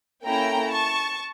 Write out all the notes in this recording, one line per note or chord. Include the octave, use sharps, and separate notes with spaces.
A#3 C#4 E4 A4 G5 A#5
A5 C#6